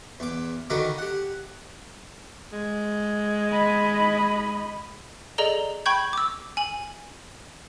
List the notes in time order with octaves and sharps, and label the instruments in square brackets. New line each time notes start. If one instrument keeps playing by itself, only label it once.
[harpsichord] E2 D6
D3 D#3 D#4 F#4 B4 D6
G4 F#5
[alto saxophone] G#3
[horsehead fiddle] D#5 B5
[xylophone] G#4 A4 D5 D#5 A#5 G7
G5 B5 C#6 G6 G#6
D6 E6
G#5 F#7